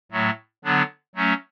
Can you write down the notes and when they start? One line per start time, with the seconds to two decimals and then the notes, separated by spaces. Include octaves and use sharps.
0.12 A2 F#3 A3
0.64 D3 F#3 B3 D4
1.15 F#3 A3 C#4